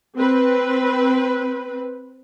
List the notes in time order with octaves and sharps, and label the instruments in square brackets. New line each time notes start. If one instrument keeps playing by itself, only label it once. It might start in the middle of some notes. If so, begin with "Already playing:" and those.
[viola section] C4 B4